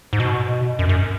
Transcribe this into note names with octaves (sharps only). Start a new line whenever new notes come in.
G#2
B2
F#2
F#2